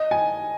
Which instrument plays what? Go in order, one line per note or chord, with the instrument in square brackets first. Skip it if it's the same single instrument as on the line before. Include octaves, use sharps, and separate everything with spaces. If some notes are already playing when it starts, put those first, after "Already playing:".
Already playing: [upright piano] D#5
G#5